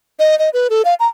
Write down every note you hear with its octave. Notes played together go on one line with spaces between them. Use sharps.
D#5
D#5
B4
A4
F5
A#5